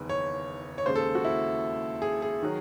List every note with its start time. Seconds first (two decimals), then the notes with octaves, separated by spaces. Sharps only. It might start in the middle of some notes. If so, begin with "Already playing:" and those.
Already playing: F#1 E2 D#3
0.09 C#5
0.78 C#5
0.86 D#2 C#3 G#3 C5
0.95 A4
1.15 F#4
1.25 E4
2.02 G#4
2.22 G#4
2.42 D#3 F#3